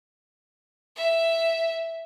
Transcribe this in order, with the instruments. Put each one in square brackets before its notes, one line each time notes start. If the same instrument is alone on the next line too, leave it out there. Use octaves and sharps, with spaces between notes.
[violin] E5